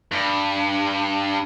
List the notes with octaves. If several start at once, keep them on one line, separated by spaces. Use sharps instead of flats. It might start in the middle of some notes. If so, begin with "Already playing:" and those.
G2